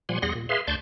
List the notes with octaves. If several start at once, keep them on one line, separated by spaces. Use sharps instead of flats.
A#2 F3 G3 F#5 G#5 C6
E2 G3 G#4 F#5 C6 A#6
A#2
G#4 B4 E5 F5 C6
D2 D5 A5 C6 C#6 G6